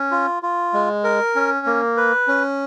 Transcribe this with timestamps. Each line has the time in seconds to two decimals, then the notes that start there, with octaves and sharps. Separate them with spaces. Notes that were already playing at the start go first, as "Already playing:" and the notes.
Already playing: C#4
0.11 F4
0.43 F4
0.73 G#3
1.04 A#4
1.35 C#4
1.66 A#3
1.97 B4
2.28 C#4